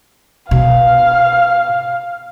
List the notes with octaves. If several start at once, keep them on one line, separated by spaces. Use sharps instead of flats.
B2 F5